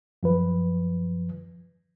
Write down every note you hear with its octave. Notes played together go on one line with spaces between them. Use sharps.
F#2 F3 B4